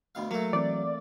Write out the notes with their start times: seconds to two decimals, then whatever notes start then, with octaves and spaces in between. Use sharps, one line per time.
0.15 D2 B2 F5
0.31 F#3 A3 A#3
0.53 E3 C4 D5